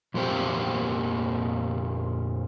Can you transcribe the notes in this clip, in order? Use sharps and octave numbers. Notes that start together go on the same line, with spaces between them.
F2 A#2 A#3 C4 G4